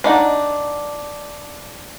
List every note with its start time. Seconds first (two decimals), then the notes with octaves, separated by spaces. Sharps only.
0.04 D4 D#4 F#5